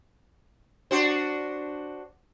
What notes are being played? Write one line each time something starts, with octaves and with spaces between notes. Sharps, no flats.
D4 F#4 C5